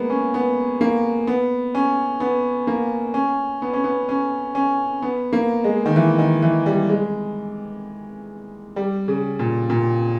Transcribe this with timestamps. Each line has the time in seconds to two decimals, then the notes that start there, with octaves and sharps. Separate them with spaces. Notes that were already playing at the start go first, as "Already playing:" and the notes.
Already playing: G#3 A#3 B3
0.10 C#4
0.34 B3
0.81 A#3
1.27 B3
1.75 C#4
2.20 B3
2.67 A#3
3.14 C#4
3.62 B3
3.73 C#4
3.84 B3
4.09 C#4
4.55 C#4
5.02 B3
5.33 A#3
5.64 G#3
5.86 D#3
5.96 E3
6.18 D#3
6.42 E3
6.66 G3
6.89 G#3
8.76 G3
9.08 C#3
9.39 A#2
9.70 A#2